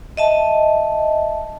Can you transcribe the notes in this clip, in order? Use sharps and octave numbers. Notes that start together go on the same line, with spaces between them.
D#5 E5 A5